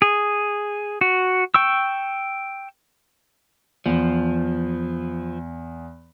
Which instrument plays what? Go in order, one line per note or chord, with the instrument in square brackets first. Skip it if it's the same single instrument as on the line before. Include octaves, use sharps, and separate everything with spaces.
[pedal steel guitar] G#4
F#4
G5 C#6 E6
[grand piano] E2 [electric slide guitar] F3